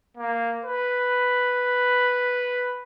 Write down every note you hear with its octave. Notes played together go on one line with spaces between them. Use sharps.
A#3
B4